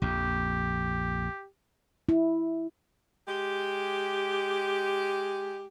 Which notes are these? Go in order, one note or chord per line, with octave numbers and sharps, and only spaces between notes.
A#1 F2 G4
E4
G#3 G4